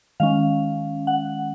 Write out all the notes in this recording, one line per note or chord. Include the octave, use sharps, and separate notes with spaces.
D#3 G#3 C#4 F5
F#5